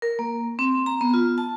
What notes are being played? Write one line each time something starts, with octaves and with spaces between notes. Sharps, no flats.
A#4
A#3
C4
A#5
B3
F4
A5